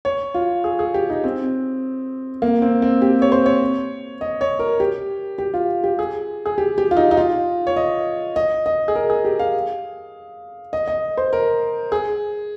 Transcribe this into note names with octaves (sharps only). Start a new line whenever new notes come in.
C#5
F4
G#4
G#4
G4
D#4
C4
A#3
C4
C4
G4
C#5
C5
C#5
D#5
C#5
A#4
G4
G4
F4
G4
G#4
G#4
G4
G4
F4
D#4
D#4
F4
C#5
D#5
D#5
D#5
G#4
A#4
G#4
G4
F5
D#5
D#5
C5
A#4
G#4